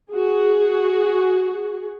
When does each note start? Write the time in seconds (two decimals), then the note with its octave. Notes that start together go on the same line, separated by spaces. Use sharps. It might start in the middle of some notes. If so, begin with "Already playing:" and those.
0.12 F#4 G#4